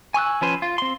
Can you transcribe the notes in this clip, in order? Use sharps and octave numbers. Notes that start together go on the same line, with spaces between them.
G#5 C#6 E6 F#6
F3 C#4 B4 C5
F4
C4 C6